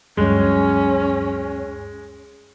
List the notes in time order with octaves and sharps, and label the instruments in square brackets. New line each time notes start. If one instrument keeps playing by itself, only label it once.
[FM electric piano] D2 G2 F#3 [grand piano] G#3 [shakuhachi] C#4